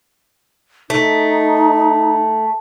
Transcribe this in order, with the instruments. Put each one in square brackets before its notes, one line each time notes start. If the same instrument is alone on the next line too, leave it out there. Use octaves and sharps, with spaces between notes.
[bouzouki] A3 [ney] D#4